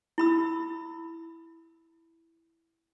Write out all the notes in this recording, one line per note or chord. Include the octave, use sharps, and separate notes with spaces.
E4 B5 E6